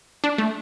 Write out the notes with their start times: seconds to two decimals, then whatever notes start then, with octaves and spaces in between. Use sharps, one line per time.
0.24 D4
0.38 A3